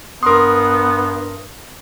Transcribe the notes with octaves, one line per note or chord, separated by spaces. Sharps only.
G2 B3 A#4 C6 D#6